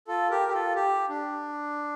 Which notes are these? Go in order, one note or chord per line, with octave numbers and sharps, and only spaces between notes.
F4 A4
G4 A#4
G4
F4 A4
G4
D4